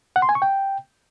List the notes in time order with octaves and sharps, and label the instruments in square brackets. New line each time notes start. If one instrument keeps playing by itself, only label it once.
[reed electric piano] F#5
C6
G#5
C#6
G5